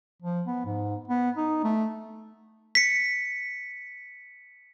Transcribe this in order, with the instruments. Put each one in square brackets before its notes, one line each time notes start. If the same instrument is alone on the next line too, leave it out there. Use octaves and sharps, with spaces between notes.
[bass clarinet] F3
B3
G#2
B3
D#4
A3
[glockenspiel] B6 C#7